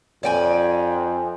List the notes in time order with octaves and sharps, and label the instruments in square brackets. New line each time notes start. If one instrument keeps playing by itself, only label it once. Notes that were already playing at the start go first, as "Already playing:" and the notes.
[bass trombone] F2 [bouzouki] D5 G5 G#5